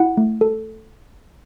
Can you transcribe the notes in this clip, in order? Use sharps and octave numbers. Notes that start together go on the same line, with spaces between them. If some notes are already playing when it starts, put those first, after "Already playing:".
Already playing: E4 F#5
A3
A4